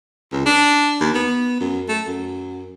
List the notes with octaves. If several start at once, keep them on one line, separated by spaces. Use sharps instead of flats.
C#2
D4
D#2
B3
F#2
A3
F#2